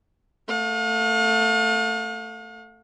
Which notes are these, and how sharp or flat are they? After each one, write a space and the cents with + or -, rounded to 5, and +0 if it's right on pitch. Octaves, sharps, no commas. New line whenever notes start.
A3 +15 F5 +45